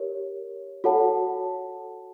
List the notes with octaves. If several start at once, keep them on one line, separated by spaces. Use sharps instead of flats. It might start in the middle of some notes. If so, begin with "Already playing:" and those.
Already playing: G4 A#4 C#5
F#4 A4 C#5 F#5 A5